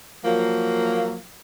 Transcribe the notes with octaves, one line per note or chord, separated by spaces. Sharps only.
F3 F#3 A#3